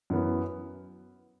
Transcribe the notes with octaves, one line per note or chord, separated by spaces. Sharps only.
F#2 E3 B3